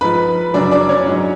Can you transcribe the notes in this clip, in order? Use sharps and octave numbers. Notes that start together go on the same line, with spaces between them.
G#2 F3 B4 B5
F#2 C#3 F#3 D4 D5
D4 D5
C#4 C#5
G#2 F#3